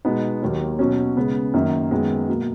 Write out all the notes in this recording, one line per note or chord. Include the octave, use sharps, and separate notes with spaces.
B2 G#3 B3 D#4
D#2 D#3 F#3 A#3
B2 F#3 C#4
C#3 G#3 B3
F#2 D#3 A#3
F#2 D#3 G#3 B3
B2 F#3 A#3